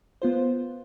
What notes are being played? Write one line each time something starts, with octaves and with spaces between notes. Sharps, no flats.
B3 F4 C5